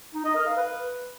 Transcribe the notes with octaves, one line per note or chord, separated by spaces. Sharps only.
D#4
D#5
A#4
F5
B4